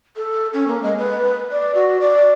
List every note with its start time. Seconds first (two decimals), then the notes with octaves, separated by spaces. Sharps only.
0.16 A4
0.53 C#4
0.68 A#3
0.83 G#3
0.98 B4
1.51 D5
1.75 F#4
2.01 D5